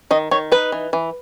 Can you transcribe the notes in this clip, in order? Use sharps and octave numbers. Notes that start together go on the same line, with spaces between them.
D#3 D#5
D#3 C#5
D#4 B4
E3
E3